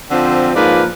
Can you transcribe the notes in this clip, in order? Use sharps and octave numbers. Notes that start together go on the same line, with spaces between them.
D3 F3 C4
G#2 F3 A#3 B4 D5